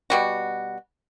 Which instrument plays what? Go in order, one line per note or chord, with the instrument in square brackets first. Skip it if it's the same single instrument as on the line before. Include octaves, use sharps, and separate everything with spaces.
[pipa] B2 G3 F#4